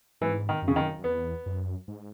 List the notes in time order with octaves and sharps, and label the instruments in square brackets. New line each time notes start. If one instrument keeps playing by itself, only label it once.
[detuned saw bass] G#2 [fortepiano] E3
[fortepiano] D#3
[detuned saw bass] F#2
[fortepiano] C#3
[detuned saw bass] E2 [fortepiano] D#3
[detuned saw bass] F#2
F#2
[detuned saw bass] E2 [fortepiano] B3
[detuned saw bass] F#2
G#2